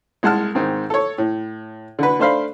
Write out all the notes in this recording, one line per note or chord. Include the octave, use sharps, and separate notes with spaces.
C2 G#3 F#5 A5 F6
G#2 D#3 C4
A4 C#5
A2
D3 F#4 B4
A3 D4 C5 F5 B5